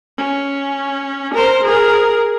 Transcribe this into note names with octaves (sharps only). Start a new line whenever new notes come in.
C#4
A#4 C5
G#4 A#4